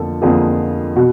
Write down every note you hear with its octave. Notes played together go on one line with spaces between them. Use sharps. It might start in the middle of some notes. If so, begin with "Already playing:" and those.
Already playing: F2 D3 F3 A#3 A4
F2 D3 F3 A#3 G#4
B2 F#4